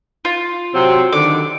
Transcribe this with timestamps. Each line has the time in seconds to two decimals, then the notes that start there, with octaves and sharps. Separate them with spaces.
0.25 F4
0.74 C3 F#3 C4
1.12 D3 D#3 D6